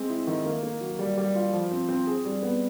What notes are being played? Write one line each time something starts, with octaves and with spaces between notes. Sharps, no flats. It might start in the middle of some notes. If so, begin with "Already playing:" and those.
Already playing: G#3 C4
E4
D#3
A#3
A#3
F#3
G3
G3
F4
F3
C4
C4
G#4
G3
B3